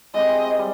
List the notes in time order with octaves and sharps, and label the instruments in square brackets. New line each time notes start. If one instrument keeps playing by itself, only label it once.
[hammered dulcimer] G#3 C4 E4 G4 [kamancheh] D#5
[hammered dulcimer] G3